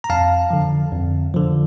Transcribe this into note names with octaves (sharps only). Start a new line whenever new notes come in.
A#5
F2 F5 A5
D3 F3
F2
D3 F3